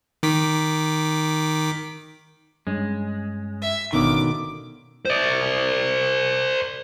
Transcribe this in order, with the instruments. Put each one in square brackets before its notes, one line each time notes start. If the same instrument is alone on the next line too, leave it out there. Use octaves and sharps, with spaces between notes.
[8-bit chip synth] D#3 D6 B6
[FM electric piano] G2 C#4 [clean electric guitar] G#3
[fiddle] E5
[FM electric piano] G1 C#4 F5 [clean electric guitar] B2 D3 D#3 [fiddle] D6
[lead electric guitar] C5 D5